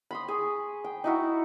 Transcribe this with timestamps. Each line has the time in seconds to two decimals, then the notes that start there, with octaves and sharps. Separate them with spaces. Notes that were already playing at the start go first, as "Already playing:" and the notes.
0.11 B5 C6 D#6
0.28 G#4 C#6
0.84 G5
1.04 D#4 E4 F#4